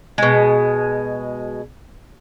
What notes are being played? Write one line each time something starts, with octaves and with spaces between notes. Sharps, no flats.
B2 G#3